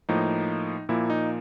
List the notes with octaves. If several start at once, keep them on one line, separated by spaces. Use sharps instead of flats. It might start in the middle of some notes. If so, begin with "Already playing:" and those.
A2 F3 A#3 D#4
A#2 F3 A#3 E4
D#4